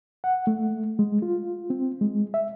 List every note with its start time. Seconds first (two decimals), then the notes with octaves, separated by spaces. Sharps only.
0.24 F#5
0.47 A3
0.99 G#3
1.22 F4
1.70 C4
2.01 G#3
2.34 E5